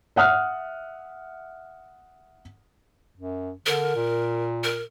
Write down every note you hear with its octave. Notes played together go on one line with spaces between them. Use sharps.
E5 F#5 D#6 F6 F#6
F#2
D3 A#4
A#2
A#4